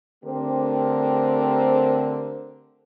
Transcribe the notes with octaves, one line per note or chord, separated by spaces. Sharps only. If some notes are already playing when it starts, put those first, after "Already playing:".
D3 A3 C4 G4 A#4 C5